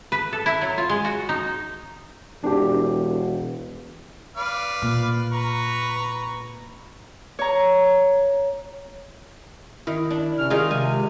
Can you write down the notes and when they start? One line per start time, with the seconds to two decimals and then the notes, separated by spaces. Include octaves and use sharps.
0.12 B4
0.33 A4
0.46 E4
0.61 F#3
0.78 F4
0.89 G#3
1.05 F#4
1.29 D#4
2.43 E1 D4 G4
4.36 B4 D5 F5
4.82 A#2
5.32 B4 A#5 C#6
7.39 C#5 A#5
9.87 D#3 E4
10.10 D4
10.37 C3 C#4 F6
10.50 D#3 D#4 F4 G#4
10.71 C3 G#3 G#5